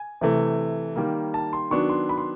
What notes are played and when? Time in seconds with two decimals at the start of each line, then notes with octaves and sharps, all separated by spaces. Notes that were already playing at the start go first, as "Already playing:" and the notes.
Already playing: G#5
0.21 C3 E3 A3
0.96 D#3 G3 A#3
1.34 A5
1.53 C6
1.71 D#3 F#3 B3 D4 C#6
1.89 C6
2.09 B5
2.18 C6